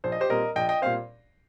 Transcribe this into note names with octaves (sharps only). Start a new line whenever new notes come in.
A#1 C5
D#5
G4 C5
A#2 G3 C4 A#4 D#5
A#1 D#5 G5
D#5 G5
A#2 G3 C4 C5 F5